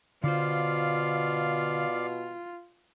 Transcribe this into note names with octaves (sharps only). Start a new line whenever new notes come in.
B2 D3 F4 C5 D5 F5